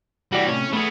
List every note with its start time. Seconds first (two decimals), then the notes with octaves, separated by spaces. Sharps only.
0.33 E3 G3 F#4 G4 D5
0.47 D2 A2 C3 C#4
0.73 A3 B3 G#4